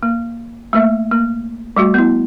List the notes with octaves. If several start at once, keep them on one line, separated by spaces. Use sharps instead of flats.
A#3
A3 A#3 E5
A#3
G3 A3 F#4
B3 E4